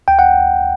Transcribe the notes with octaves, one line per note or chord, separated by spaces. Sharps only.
D2 G5
F#5